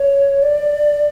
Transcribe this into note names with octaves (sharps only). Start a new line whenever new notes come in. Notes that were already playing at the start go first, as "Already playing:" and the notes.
Already playing: C#5
D5